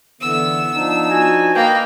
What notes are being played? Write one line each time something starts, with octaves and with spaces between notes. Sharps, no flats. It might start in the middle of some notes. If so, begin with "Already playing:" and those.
D3 E3 B3 E6
F3 D4 D#4
F#4 G#5
A#3 A#4 B4 D#5 G5